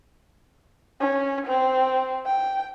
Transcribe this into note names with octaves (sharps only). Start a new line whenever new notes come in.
C#4
C4
G5